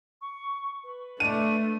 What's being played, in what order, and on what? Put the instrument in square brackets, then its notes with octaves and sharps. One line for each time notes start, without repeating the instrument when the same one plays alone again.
[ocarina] C#6
B4
[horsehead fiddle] A3 [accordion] D4 [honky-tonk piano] D#7